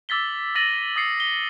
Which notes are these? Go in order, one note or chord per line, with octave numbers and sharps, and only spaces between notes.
D6 E6 A6 B6 G7
E6 A6 A#6 D#7 F#7
D#6 A6 C7 C#7
G7